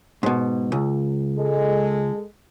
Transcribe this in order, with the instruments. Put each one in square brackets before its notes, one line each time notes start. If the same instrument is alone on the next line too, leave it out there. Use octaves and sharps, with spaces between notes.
[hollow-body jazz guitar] G#2 B2
C#2
[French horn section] G#3 A4